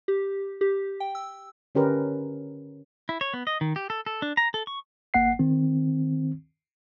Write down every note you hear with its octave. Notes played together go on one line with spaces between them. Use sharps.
G4
G4
G5
E6
D3 C#4 G4 A#4 B4
E4
C#5
B3
D#5
D#3
G4
A4
A4
D4
A#5
A4
C#6
G1 A#3 F#5 C7
D#3 C4